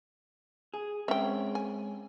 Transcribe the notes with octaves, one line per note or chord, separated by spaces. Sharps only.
G#4
G#3 C4 C#4 E5 G5
G#5